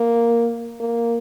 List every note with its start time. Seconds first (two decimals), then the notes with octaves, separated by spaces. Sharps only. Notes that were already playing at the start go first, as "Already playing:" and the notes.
Already playing: A#3
0.80 A#3